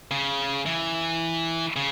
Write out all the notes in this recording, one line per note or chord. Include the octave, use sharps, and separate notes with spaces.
C#3
E3
C#3